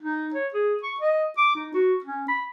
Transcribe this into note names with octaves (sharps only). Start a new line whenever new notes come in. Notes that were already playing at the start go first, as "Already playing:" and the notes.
D#4
C#5
G#4
C#6
D#5
D6
D#4
F#4
C#4
B5